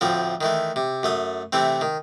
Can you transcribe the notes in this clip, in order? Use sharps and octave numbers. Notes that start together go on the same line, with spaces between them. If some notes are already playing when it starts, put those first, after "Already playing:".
D2 A2 F3 C4
D#3 E3 A3
C3
F#2 A3 D#6
C3 E3 A3 C4
D#3